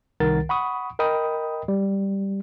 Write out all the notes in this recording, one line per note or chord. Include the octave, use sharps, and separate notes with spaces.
C2 D#3 A#4 F#5 A6
F#5 B5 C#6 D#6
A#4 D#5 G5 B5 D#6
G3